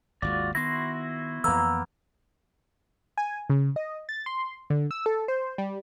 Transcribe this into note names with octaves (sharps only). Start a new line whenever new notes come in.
G#1 D#2 G#3 F4 F#4 D5
D#3 B3 E4 F#4 C6 A#6
F2 E3 A#3 B3 E6
G#5
C#3
D#5
A6
C6
D3
E6
A4
C5
G3